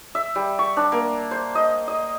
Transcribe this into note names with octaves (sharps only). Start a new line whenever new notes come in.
E5
G3
C#6
D4
A#3
C5
D#5
D#5